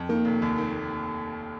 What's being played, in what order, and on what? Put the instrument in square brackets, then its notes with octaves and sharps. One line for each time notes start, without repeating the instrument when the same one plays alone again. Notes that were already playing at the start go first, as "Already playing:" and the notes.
Already playing: [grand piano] F2
[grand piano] D#3 [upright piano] A#3
[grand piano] F1
D#2
D#3